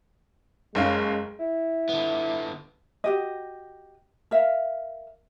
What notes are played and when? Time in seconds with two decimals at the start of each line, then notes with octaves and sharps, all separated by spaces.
0.75 F#1 G#3 C#4 F5
1.40 E4
1.89 D3 B3
3.04 F#4 G4 D#5
4.31 A#4 E5 F5